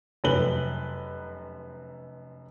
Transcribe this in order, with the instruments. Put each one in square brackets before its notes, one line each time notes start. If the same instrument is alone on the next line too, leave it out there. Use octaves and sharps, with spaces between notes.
[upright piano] F1 F#2 B4 F#7 G7